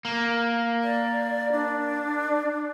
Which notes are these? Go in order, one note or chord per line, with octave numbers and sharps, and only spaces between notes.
A#3
D5
D4